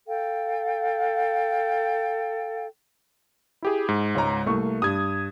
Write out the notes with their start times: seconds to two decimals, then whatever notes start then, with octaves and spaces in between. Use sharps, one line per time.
0.07 A4 F5 G5
3.62 E4 G4 G#4
3.89 G#2
4.15 C#2 C#5 A#5
4.46 C2 A3 A#3 C#6
4.82 G2 D#6 G#6